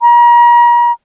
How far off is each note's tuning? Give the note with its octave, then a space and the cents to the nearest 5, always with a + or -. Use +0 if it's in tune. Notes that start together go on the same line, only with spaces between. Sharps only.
A#5 +40